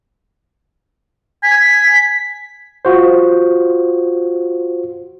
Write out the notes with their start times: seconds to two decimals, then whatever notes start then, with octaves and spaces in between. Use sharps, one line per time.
1.43 G#5 B6
2.85 F4 F#4 C5